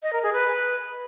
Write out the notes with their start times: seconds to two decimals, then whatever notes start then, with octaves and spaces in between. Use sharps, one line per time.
0.03 D#5
0.13 A#4
0.23 G#4
0.33 B4